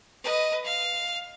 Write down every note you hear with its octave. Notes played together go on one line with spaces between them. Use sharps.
B4 D#5
F5